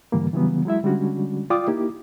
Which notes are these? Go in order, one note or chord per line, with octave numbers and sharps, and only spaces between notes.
G#2 D3 E3 G3 A#3
C#3 E3 F#3 G3 B3
F#3 G#3 E4 E5
D3 G3 G#3 C#4 D4 F#4
F4 D5 F5 G5 D6 D#6
A#3 D#4 E4 G4